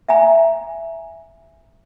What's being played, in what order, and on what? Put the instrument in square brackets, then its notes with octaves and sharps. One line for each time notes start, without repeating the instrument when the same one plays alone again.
[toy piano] E5 G#5 A#5